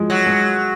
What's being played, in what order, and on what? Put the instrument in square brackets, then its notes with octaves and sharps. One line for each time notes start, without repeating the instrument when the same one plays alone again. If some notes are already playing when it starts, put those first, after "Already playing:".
Already playing: [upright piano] F3 G#3
[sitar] F#3
[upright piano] G#3